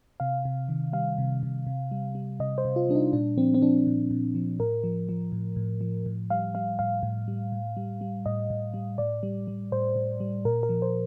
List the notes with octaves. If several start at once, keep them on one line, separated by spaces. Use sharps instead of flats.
C3 F5
C3
D#3
G3 F5
C3
C3
C3
G3
G3
C3 D#5
C5
C3
F4
G3 D4
D#4
A#2 D4
F3 C4
C4
F3 D4
A#2
A#2
F3
A2 A#4
F3
F3
A2
A2
F3
A2
G3 F5
G3 F5
A2 F5
A2
G3
A2
G3
G3
A2 D#5
A2
G3
A2 D5
G3
G3
A2 C5
A2
G3
A#2 A#4
A#4
F3
C5